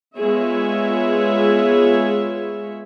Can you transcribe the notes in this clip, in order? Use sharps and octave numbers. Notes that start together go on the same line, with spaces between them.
G#3 B3 F4 G#4 C#5 E5